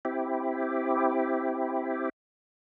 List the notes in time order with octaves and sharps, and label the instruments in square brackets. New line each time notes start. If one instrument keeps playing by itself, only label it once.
[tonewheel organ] C4 E4 G4